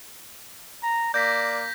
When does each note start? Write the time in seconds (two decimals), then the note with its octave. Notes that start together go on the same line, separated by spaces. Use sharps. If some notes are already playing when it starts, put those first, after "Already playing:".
0.83 A#5
1.14 A#3 D5 G6 A#6 B6